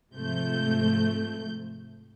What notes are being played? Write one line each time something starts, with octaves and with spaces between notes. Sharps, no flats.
G#2 C3 F3 A3 G6